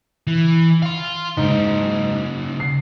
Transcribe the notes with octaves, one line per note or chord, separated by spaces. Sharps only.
E3
F5 C6
G#2 C#3 A#3
C7